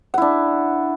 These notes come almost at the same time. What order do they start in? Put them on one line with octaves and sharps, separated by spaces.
F#5 E4 D4